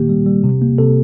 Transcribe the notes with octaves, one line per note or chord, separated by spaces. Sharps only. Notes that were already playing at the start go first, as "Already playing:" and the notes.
Already playing: A#2 D#3 A#3 G4
G3
G3
C3
A#3
C3 A4